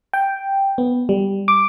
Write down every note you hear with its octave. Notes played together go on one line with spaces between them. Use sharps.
G5
B3
G3
D6